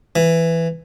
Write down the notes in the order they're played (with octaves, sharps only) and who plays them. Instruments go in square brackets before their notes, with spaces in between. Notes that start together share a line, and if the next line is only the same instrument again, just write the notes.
[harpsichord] E3